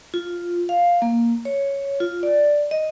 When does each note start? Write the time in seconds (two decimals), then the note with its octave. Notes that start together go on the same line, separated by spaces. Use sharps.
0.14 F4
0.69 F5
1.02 A#3
1.45 C#5
2.00 F4
2.23 D5
2.71 D#5